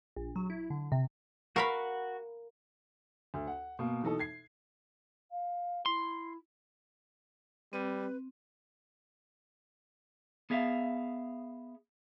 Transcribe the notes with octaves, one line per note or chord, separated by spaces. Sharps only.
A#1
F#3
E4
D3
C3
F#4 A#4 F5 F#5 B5 C#6
D2
F#5
B2 A#3
B2 E3 D#4 A4
G#6 C7
F5
E4 C6
G3 C4 B4
B3 G#4 E5 F5